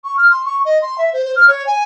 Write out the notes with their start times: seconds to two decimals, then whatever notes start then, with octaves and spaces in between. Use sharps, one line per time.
0.04 C#6
0.17 F6
0.30 C6
0.45 C#6
0.64 D#5
0.81 C6
0.98 E5
1.13 C5
1.24 C5
1.35 F6
1.47 C#5
1.66 G#5